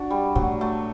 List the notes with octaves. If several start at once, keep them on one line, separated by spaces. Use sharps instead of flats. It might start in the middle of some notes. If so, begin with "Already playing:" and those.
Already playing: D4 F#4
G3
A2 F#3
A3